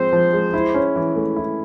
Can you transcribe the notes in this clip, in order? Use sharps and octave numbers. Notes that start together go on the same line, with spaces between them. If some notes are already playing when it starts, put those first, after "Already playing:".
Already playing: F3 G#3 C4 C5
F3
G#3
E4
C#4
E3
A3
E4